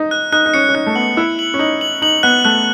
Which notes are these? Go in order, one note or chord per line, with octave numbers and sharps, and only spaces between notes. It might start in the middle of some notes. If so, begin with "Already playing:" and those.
Already playing: D#4
F#6
D#4 F#6
D#4
C#4 C#7
C#4
D#4 F#6
A3
B3 F#7
E4 F#6
F#7
C#4
D#4 F#7
F#7
D#4 F#7
B3 F#6
A3 F#6